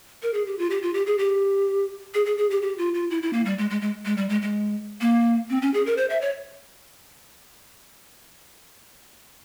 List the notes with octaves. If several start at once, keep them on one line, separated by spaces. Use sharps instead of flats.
A#4
G#4
G4
F4
G4
F4
G4
G#4
G4
G#4
G#4
G#4
G4
G4
F4
F4
E4
E4
A#3
G3
G#3
G#3
G#3
G#3
G3
G#3
G#3
A#3
C4
C#4
G#4
A#4
C5
E5
C#5